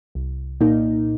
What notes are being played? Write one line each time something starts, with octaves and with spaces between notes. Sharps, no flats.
C2
A#2 A#3 D#4